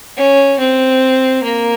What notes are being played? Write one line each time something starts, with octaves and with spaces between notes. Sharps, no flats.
C#4
C4
A#3